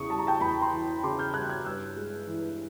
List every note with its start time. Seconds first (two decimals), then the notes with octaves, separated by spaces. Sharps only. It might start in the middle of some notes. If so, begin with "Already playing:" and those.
Already playing: E2 C#3 C#6 D#6
0.10 G3 A5
0.19 A#5
0.27 G5 A5
0.40 E2 A5 B5
0.62 A#5 C6
0.72 E3
1.03 C#3 C6 D6
1.19 F6 G6
1.34 G3 F#6 G#6
1.50 F#6 G#6
1.65 G2 E6 F#6
1.96 G#3
2.27 E3